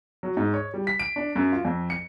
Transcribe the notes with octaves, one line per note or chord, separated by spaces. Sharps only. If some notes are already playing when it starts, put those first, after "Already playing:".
F#3
G#2
C#5
G3
B6
D7
D4
F#2
F4
F2
C#7